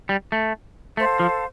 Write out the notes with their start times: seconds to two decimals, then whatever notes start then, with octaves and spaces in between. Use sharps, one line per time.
0.09 G3
0.32 A3
0.97 A3 A4 C5 F5 A5
1.20 F3